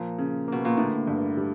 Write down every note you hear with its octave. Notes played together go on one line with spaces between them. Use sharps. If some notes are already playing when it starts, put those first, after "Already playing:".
Already playing: A#2 F3
C#3
B2 A#3
A#2
A2 D3
G2
G3